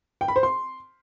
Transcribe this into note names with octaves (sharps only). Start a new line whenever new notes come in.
G5
B5
C5
C6